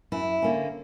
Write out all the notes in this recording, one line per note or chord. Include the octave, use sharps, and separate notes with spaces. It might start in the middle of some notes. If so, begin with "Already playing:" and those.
F#2 E4
D3 A#3 C#4